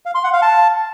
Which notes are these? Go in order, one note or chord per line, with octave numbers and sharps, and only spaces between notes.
F5
C6
F#5
F5
A5